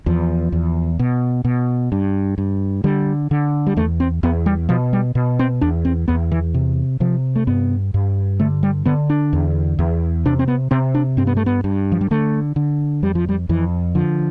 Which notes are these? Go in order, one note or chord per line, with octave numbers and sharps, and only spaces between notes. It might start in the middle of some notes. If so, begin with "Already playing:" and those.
E2 F3
E2
B2
B2
G2
G2
D3 G3
D3
G3
E2 A3
C4
E2 B3
G3
B2 F3
G3
B2
C4
E2 D4
C4
E2 B3
E3
C3
C3 F3
A3
G2 B3
G2
D3 A3
G3
D3 B3
D4
E2
E2
C3 D4
C4
B3
C3 C4
D4
G2 C4
B3
A3
B3
G2
F3
G3
D3 A3
D3
F2 G3
F3
G3
F2 E3
D3 F3